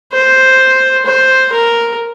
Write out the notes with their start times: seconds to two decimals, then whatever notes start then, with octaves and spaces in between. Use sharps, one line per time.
0.12 C5
1.06 C5
1.52 A#4